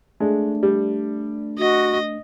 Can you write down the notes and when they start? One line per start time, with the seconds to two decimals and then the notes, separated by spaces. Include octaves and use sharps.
0.20 G#3 A3 D4
0.63 G3
1.59 F#4 D#5